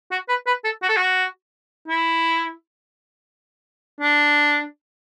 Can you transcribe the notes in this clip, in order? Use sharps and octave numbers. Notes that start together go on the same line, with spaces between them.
F#4
B4
B4
A4
F#4
A4
F#4
E4
D4